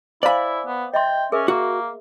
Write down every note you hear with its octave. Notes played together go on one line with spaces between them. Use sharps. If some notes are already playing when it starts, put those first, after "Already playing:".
E4 C5 D5 F5 G#5 B5
B3
D#5 E5 G5 C6
C#4 G#4 A#4 E5
A#3 F#4